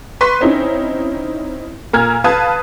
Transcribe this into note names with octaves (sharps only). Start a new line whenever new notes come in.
B4 C6 C#6 B6
C4 C#4 D#4 E4
A#2 A#5 F6 G#6
B4 F5 A5 D#6 G#6